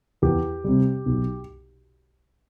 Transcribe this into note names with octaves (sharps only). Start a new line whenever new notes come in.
E2 G4
C3 G3
B1